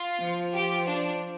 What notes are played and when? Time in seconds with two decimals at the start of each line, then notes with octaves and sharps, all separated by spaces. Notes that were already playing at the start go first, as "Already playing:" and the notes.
Already playing: F4
0.20 F3
0.54 G4
0.87 D4